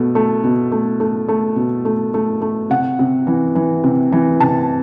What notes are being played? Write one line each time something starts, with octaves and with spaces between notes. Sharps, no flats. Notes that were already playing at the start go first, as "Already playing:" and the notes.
Already playing: B2 A3
A3
B2
A3
A3
A3
B2
A3
A3
A3
C3 F#5
C3
E3
E3
C3
E3
C3 A5